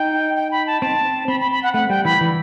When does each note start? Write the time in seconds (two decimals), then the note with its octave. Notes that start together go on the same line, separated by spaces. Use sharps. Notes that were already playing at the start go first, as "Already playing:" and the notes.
Already playing: D#4 G5
0.36 G5
0.51 B5
0.67 A5
0.82 C4 A5
1.28 C4 B5
1.40 B5
1.52 B5
1.63 F#5
1.74 A3 F#5
1.89 G3 G5
2.05 E3 B5
2.21 E3